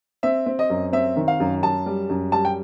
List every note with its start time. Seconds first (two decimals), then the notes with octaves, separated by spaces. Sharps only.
0.23 C4 E5
0.46 C4
0.59 D#5
0.70 F#2
0.93 C4 E5
1.16 D#3
1.28 F5
1.40 F#2
1.63 F#2 A5
1.86 G3
2.10 F#2
2.32 G3 A5
2.45 G5